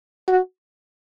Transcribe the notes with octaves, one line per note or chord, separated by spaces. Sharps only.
F#4